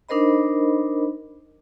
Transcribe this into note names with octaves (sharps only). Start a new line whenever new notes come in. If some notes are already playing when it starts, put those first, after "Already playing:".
D4 D#4 A#4 C5 D#5 B5